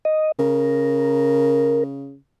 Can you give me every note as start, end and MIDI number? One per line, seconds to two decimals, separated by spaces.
0.05 0.32 75
0.39 2.17 49
0.39 1.83 70